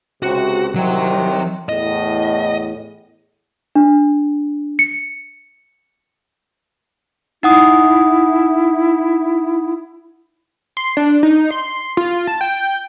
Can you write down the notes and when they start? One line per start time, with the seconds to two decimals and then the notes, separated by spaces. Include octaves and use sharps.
0.23 C#2 C3 F#4
0.75 C2 C3 D#3 F#3
1.69 E2 A2 D#5
3.75 D4
4.79 C#7
7.43 D#4 E4 F#5 D#6
10.77 C6
10.97 D4
11.23 D#4
11.51 C6
11.97 F4
12.27 A5
12.41 G5